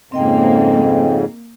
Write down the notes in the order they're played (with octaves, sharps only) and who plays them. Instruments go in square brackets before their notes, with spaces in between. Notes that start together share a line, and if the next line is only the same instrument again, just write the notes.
[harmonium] F2 G#2 C#3 [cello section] A#3 [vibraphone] C4 D#5 G5